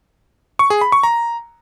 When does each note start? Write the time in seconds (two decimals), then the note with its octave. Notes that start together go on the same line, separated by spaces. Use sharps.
0.59 C#6
0.70 G#4
0.81 B5
0.92 C#6
1.03 A#5